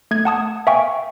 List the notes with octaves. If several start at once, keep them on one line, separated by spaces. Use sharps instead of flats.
A3 G#6
F#5 A5 D#6 G#6
E5 F5 G5 G#5 C#6